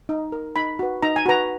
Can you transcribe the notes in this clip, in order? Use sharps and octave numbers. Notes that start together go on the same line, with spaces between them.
D#4
A#4
D#4 B5
F#4 B4
D#4 A#5
G#5
F#4 B4 A#5